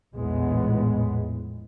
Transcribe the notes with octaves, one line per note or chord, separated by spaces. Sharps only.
A#1 E2 A2 G#3 B3